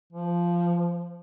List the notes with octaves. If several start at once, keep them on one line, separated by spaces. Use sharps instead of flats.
F3